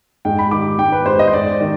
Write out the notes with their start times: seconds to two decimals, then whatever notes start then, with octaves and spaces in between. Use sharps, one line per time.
0.25 G#2 G5
0.39 B5
0.51 D#3 D6
0.78 G#2 G5
0.92 B4
1.06 G#2 C5
1.19 D#5
1.28 C5
1.33 G#2 D5
1.61 D#3